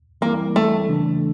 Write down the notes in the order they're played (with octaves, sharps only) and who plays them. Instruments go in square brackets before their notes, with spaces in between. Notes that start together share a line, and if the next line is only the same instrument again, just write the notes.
[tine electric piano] E3 G3 C4 E4 [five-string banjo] A#3
[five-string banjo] A3
[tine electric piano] C#3 E3 A3 D4